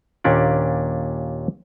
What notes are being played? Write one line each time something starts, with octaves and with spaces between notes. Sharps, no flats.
D#2 A#2 C#4 D4 D5